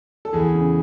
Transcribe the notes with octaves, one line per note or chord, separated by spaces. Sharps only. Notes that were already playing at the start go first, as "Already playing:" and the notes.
A4
E2 G#4
C#3